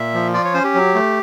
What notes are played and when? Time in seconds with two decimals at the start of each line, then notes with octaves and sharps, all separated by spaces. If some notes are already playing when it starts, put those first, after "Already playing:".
Already playing: A#2 E5
0.14 F3
0.33 F4 D5
0.44 C#5
0.54 C#4 C5
0.64 G4
0.75 F#3
0.95 A3